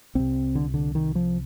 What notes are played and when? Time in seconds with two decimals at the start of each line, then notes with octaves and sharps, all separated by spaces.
0.15 C2 C3 C4
0.55 D3
0.74 D3
0.95 D#3
1.15 F3